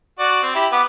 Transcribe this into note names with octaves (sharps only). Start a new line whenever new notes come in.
F#4 D5
C4
E4 G4
B3 D6